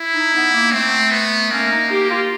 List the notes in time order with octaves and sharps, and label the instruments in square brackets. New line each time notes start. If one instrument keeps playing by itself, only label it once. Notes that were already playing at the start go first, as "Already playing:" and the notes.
Already playing: [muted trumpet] E4
[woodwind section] D#4
B3
A#3
[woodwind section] A3 [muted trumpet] C4
[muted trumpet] B3
[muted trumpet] A#3 [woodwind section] C#4
[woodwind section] D#4
G4
F4